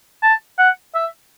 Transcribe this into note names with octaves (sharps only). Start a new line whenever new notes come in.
A5
F#5
E5